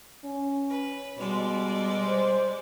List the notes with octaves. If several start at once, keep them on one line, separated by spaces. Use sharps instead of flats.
C#4
B4
B2 G3 G#3 D5
C5